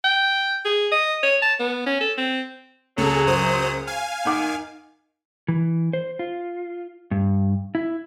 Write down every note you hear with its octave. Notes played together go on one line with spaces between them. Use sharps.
G5
G#4
D#5
C#5
A5
B3
C#4
A4
C4
C#2 A#2 F#3 G#4 A4
F#2 C5 D#6
F5 G#5
D#3 D#4 F#5 D6
E3
C5
F4
G2
E4